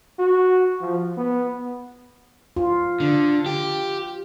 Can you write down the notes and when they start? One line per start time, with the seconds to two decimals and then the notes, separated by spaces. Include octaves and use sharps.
0.19 F#4
0.81 F3
1.17 B3
2.56 F4
3.00 D3
3.46 G4